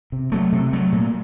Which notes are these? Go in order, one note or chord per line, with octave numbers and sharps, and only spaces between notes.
C3
F#3 A3
C3
F#3 A3
A#2